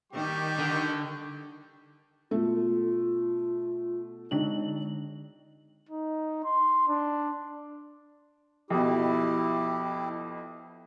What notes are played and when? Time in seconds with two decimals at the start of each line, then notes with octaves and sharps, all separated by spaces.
0.12 D#3 G3 G4 C#6
0.59 D3
2.31 B2 A3 F4
4.31 D3 G#3 D4 D#4 F#7
5.89 D#4
6.44 C6
6.88 D4
8.70 F2 B2 E4 G4